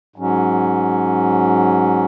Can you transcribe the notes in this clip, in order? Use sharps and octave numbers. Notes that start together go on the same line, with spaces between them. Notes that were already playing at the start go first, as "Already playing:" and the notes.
G#2 F#3 C#4